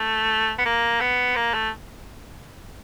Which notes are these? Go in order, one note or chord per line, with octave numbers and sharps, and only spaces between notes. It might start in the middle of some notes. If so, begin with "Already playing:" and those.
Already playing: A3
B3
A#3
B3
A#3
A3